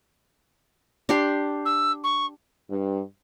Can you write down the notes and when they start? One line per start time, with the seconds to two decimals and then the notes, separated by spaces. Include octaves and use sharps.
1.09 D4 G4 C6
1.65 E6
2.04 C#6
2.69 G2